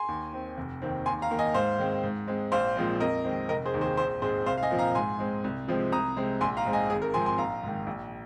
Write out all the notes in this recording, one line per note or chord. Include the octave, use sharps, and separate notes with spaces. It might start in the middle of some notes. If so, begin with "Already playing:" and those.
Already playing: G#5 C6
D#2
D#3 C4
F1
D#2 D#3 C4
D#2 G#5 C6
F5 A#5
D#3 A#3
D#5 G#5
G#2 C5 F5
D#3 G#3 C4
G#2
G#3 C4
A#1 C5 F5
A#2 F3 G#3 C4
F2 A#4 D#5
D#3 G#3 C4
F1 A#4 D#5
G#4 C5
D#2 D#3
G#4 C5
A#1 G#4 C5
G#2 G#3 C4 G#4 C5
C2 C5 F5
F5
D#5 G#5
A#2 F3 C4
F5 A#5
G#2 G#5 C6
G#3 C4
C2
C3 F3 G#3 C4
C2 A#5 D#6
C3 G#3 C4
A#1 G#5 C6
F5 A#5
G#2 G#3 C4
D#5 G#5
G#1 G#4
A#4
G#2 F3 C4 G#5 C6
G#5 C6
A#1 F5 A#5
G#2 D#3
A#1